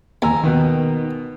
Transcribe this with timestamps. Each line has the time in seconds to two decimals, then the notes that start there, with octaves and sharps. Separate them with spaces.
0.22 D#2 G#5 A#5 E6
0.44 B2 D#3 B3 G5